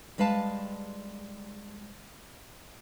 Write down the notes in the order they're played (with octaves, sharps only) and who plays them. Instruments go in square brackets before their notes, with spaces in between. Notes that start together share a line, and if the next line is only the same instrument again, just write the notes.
[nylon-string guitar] G3 G#3 B4 F5 A5